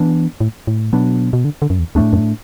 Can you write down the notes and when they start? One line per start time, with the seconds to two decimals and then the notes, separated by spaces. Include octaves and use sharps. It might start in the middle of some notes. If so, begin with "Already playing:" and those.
Already playing: E3 B3 D4
0.41 A2
0.67 A2
0.93 B2 F#3 B3 D4
1.33 B2
1.45 D3
1.62 D3
1.70 F#2
1.79 E2
1.95 E2 A2 A3 D4
2.13 F#2